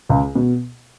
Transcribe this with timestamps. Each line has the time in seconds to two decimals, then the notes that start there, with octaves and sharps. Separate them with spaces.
0.09 C#2 C#3
0.35 B2